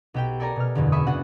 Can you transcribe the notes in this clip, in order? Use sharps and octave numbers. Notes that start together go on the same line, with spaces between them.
B1 G4 G5
A4 A#4 D5 G#5 A#5
B2 F6
F#1 E2 D3
E5 G#5 B5 C#6 D#6
C#3 B3 D4 F#4 F#5